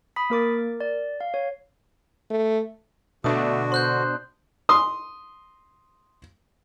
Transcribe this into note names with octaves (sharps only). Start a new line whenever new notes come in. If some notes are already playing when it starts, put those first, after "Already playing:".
B5 D#6 B6
A#3 A#4 D6 A6
A#4
D5
F5
C#5
A3
B2 D3 A3 D4 F#4 D#6
C5 C6 F#6 G6
C6 D#6